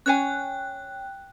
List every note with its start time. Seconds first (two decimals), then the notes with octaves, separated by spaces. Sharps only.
0.06 C#4 C#5 G5 G#5 F#6